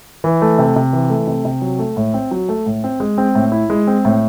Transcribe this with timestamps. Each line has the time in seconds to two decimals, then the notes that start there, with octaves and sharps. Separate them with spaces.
0.24 E3
0.42 A3
0.59 C3
0.76 C3
0.93 E3
1.10 A3
1.27 C3
1.45 C3
1.62 F#3
1.79 A3
1.97 A2
2.14 C4
2.31 F#3
2.49 A3
2.66 A2
2.84 C4
3.00 G#3
3.18 C4
3.35 A2
3.52 E4
3.70 G#3
3.87 C4
4.05 A2